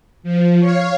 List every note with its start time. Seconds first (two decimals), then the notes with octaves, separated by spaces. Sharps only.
0.23 F3
0.60 C#5 F5